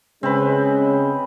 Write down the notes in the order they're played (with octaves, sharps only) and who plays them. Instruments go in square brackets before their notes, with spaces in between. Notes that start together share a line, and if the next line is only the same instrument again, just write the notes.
[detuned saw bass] C#3 [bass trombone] G#3 [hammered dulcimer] C4 B4 [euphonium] C#4